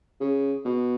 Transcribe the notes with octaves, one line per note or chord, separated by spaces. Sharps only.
C#3
B2